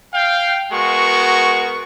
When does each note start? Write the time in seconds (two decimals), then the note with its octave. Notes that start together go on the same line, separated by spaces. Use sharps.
0.12 F5 G5
0.71 G#3 B3 F#4 A#4 C#6